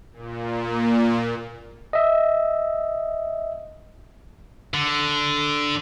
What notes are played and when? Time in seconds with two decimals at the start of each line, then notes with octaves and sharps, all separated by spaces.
0.13 A#2
1.93 D#5 E5
4.74 D3